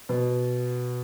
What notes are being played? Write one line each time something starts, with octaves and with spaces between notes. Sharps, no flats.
B2